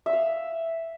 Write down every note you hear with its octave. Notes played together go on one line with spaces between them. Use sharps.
E5 F5 E6